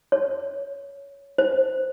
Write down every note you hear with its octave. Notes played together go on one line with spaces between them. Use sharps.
C#5
C5